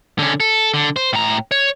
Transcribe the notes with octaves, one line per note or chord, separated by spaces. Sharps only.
D3 C#4
A4
D3
C5
A2 A#5
C#5